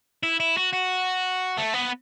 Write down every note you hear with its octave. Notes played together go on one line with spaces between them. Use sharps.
E4
E4
F#4
F#4
A3
B3